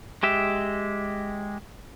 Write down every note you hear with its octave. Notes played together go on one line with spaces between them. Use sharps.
G#3 G4 E5